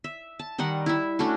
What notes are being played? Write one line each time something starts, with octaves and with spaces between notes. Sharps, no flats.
E5
A5
D#3 G3 D#4 F#5
E4 E5
A3 C#4 D4 F#4